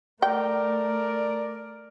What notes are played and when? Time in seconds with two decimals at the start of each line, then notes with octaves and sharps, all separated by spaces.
0.22 A3 A#4 D5 G5